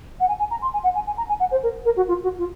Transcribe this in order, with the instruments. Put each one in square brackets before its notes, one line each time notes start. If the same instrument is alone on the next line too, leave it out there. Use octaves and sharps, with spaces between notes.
[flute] F#5
G#5
G#5
A#5
C6
G#5
F#5
G#5
G#5
A#5
G#5
F#5
C5
A#4
A#4
F#4
F4
F#4
F4